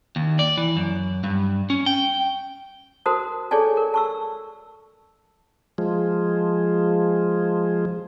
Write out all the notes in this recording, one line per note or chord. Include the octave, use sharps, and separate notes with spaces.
D#2
D5
E3
F#2
G2
C#4
G5
F#4 A#4 C5 A5 D#6
G#4 A4 C#5 D5 G#5 A5
A#4
A5 C#6 E6
F3 G#3